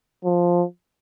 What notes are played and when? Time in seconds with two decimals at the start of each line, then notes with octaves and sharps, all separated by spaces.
0.24 F3